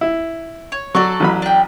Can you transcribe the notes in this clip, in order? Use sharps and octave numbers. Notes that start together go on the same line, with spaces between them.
E4
C#5
F#3 F#4 A4 D5
A1 F#3 B5
D4 G5